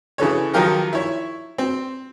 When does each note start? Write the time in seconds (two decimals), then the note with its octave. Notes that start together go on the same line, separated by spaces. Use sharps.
0.18 C#3 E3 A4 C#5
0.54 D#3 F3 F#3 F4 G4 A#4
0.93 E4 C#5 E5
1.58 C4